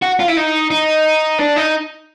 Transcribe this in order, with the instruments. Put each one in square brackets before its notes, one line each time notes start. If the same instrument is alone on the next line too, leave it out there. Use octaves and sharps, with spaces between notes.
[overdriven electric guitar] F#4
F4
E4
D#4
D#4
D4
D#4